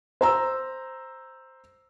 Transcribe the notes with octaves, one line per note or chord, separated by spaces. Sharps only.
C5 A#5 E6